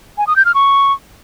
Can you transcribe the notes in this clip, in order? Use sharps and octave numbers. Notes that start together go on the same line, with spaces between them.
G#5
D#6
G6
F6
C#6